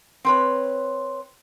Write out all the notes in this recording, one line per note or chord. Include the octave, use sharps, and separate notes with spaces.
C4 B4 C#5